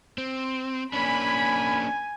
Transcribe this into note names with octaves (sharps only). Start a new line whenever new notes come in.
C4
A#3 C#4 D4 G#5 B5